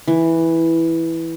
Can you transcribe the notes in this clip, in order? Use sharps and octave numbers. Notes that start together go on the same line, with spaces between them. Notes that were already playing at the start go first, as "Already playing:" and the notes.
E3